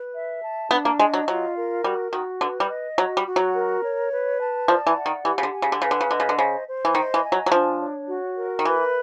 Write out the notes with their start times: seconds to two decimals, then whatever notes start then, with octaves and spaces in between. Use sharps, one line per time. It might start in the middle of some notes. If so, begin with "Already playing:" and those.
Already playing: B4
0.14 E5
0.42 A5
0.71 B3 D4
0.85 A#3
0.99 G#3 D#5
1.14 F#3
1.28 F#3 F4
1.56 A#4
1.84 G3 F#4
2.13 D#3 F#4
2.41 D3 B4
2.60 G3
2.69 D#5
2.98 F#3 F#4
3.17 G3
3.26 F#4
3.36 F#3
3.55 A#4
3.82 C#5
4.12 B4
4.40 A5
4.67 F3 D5
4.87 E3
4.96 F#5
5.06 D#3
5.25 E3 G4
5.38 C#3
5.43 D3
5.54 G#5
5.62 C#3
5.72 D3
5.82 C#3 B4
5.91 D3
6.01 C#3
6.10 D3 D#5
6.20 C#3
6.29 D3
6.38 C#3 C5
6.67 C5
6.85 E3
6.95 D#3 D#5
7.14 E3
7.24 G#5
7.32 F#3
7.46 F#3
7.52 F3 D4
7.80 C#5
8.08 F#4
8.37 A#4
8.59 D#3
8.65 E3 B4